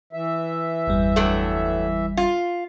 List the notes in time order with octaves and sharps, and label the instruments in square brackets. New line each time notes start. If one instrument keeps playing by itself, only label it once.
[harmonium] E3 E5
[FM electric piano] G1 E2 G3
[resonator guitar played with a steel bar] G2 F#3 A3
F4